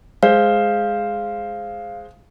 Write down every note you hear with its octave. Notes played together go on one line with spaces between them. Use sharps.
G#3 C5 F5